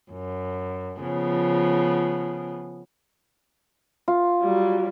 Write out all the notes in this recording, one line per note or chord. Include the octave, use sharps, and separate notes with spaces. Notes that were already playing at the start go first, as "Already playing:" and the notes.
F#2
C#3 F3 B3
F4
F#3 G3